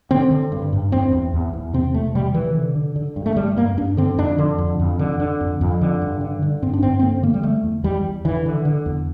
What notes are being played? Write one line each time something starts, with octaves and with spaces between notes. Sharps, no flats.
D3 C4
D3
G2
G2
E2 C4
E2
E2
E2
C3 C4
E2 A3
C3 G3
C3 E3
D3
D3
D3
G2
A3
G2 G3
G2 A#3
G2 D4
D3 C4
F2 D4
D3
F2
F2
D3
D3
F2
F2
D3
G2
D3
D3
G2 C4
D4
G2 C4
C4
D3 A#3
D3 A#3
G3
D3 A3
E2
E2 G3
E2
D3 E3
D3
D3
E2